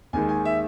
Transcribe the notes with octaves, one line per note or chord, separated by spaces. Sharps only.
D#2 D#3 G#3 G#5
G#5
E5